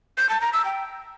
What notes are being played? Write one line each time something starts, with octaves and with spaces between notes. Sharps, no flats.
G6
A5
A#5
E6
G5